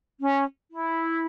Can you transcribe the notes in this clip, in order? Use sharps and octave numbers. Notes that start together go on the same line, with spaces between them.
C#4
E4